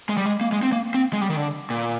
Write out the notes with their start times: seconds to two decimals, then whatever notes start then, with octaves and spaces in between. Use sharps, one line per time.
0.09 G#3
0.17 G3
0.26 G#3
0.41 A#3
0.52 G#3
0.63 C4
0.73 A#3
0.94 C4
1.13 G#3
1.21 G3
1.30 D#3
1.37 D3
1.70 A#2